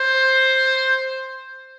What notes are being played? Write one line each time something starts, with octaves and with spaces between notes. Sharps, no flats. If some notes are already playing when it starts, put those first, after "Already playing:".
Already playing: C5